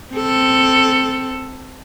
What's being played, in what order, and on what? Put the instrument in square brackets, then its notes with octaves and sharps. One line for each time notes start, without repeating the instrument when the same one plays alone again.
[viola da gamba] C4 A4